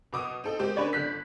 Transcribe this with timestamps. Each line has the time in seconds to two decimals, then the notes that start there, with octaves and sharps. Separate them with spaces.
0.13 B2 D6 D#6
0.44 C4 D#4 A4
0.59 G#3 C4 G4 A#4 C5
0.76 A#3 C#4 D4 B4 C#5 D5
0.93 G1 D4 F#6 B6